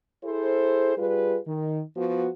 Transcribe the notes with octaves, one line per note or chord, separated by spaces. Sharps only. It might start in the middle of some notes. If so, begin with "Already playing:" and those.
E4 G#4 A4 C5
G3 F4 G#4 B4
D#3
F3 B3 F#4